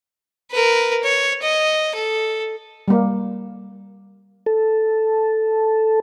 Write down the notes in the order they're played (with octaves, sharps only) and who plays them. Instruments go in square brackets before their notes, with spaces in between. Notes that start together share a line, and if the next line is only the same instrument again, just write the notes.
[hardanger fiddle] A#4 B4
C#5
D#5
A4
[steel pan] G3 A#3
[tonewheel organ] A4